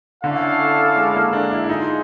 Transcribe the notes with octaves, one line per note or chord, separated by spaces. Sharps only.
D3 C#4 E4 A4 D5 F5
G#3
A#3
D4
E4
E4
D#4 F4 G#4